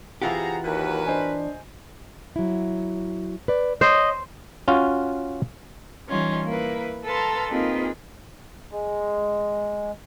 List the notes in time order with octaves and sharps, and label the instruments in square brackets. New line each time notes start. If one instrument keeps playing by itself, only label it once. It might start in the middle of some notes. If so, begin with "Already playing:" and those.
[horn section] C3 G#4 A#5 [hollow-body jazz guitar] E3 F4 G4 [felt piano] F#5
[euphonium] D#2 [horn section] F#3 A#4 B4
[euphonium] D4 [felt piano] C5 D#5 G#5
[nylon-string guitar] F#3 E4
B4 D5
[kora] C5 [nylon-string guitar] C#5 [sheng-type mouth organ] D#5
[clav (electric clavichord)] C#4 F4 F#4
[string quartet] E3 G3 C#4 D#4 F4
A#3 E4 B4
A4 B4 F5 A5 A#5 C6
A#3 C4 D#4 F4 G#4 B4
[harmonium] G#3